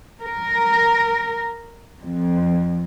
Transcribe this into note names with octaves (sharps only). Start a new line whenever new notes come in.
A#4
F2